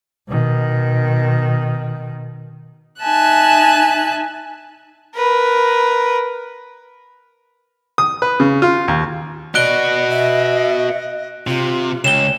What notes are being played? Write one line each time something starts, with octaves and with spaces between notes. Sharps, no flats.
B2 D#3
D#4 E5 G#5 A5 F#6
A#4 B4
D#6
B4
C#3
F4
D#2
F#4 B4 D5 D#5 F#6 D7 G7
E5
C3 F4
C#2 C#5 G5 E7 G7